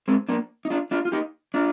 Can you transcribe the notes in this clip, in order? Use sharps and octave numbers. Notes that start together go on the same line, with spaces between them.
G#3 C4
A#3 D4
D#4
D4 F4
D4 F4
F4
D#4 G4
D4 F4